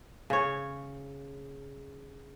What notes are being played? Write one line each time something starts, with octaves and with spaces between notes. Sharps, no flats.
C#3 C#5